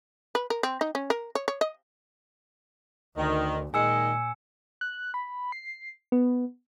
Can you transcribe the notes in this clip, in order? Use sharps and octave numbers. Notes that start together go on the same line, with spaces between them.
B4
A#4
C4
D#4
C#4
A#4
C#5
C#5
D#5
D2 D#3
A#2 D#3 G#3 G#5 E6 C#7
F#6
B5
C7
B3